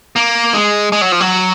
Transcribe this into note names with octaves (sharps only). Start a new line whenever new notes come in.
A#3
G#3
G#3
F#3
F3
F#3